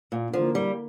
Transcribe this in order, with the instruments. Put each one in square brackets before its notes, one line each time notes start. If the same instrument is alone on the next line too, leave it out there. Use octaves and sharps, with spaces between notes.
[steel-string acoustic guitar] A#2
[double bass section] D3 A#3 [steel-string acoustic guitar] F3
[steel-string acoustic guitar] G3